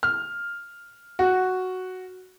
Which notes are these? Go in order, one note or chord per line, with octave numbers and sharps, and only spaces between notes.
F6
F#4